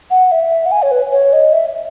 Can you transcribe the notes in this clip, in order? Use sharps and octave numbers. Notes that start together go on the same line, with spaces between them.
F#5
E5
F#5
G#5
C#5
B4
C#5
D#5
E5